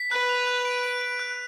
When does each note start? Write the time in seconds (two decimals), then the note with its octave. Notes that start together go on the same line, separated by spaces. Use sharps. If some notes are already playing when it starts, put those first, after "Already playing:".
Already playing: B6
0.11 B4 F#6
0.29 F7
0.47 F#6
0.65 D7
0.83 D7
1.01 D7
1.19 F#6